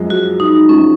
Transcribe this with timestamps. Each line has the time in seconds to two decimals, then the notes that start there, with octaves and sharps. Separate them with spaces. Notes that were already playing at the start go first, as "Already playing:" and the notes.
Already playing: F#2 F3 G#3
0.10 F#4
0.40 D#4
0.69 F#2 F3 G#3 C#4